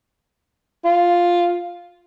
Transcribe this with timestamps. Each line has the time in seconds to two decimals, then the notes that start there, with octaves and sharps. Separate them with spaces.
0.85 F4